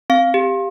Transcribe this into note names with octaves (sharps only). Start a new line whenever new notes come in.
C4 F5
G4